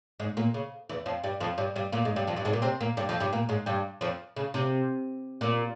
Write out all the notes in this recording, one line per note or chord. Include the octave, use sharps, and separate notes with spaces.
G#2 G#3
A#2 A#3
C#3
E2 E3
F2 F3
G2 G3
F2 F3
G2 G3
G2 G3
A#2 A#3
G#2 G#3
G2 G3
F2 F3
G2 G3
G#2 G#3
A#2 A#3
C3 C4
A#2 A#3
G2 G3
F2 F3
G2 G3
A#2 A#3
G#2 G#3
G2 G3
F2 F3
C#3
C3
A#2